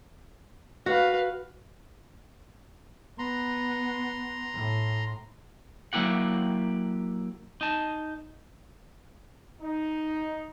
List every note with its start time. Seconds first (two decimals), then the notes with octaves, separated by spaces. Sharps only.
0.86 F#4 B4 F5
3.19 B3 A#5 C6
4.53 A2
5.93 F#3 A#3 E4 G4 F#5
7.61 D#4 A5
9.61 D#4